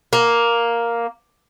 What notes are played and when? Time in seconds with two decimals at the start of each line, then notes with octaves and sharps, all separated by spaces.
0.13 A#3